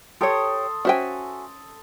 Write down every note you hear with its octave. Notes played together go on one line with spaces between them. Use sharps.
G4 A4 C#5 C6 D#6
C#4 F#4 C5 E5 G5 G#5